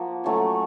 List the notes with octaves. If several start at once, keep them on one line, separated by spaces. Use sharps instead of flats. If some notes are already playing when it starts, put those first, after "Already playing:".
Already playing: F3 A#3 F#4
F#3 A3 C#4